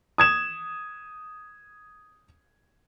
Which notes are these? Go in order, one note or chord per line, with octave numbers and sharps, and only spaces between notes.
D#6 G#6 E7